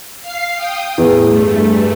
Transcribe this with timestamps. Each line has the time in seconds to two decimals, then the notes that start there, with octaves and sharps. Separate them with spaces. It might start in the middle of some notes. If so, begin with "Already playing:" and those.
0.21 F5 C7
0.55 G5 D#6
0.98 E2 A2
1.27 G2 A3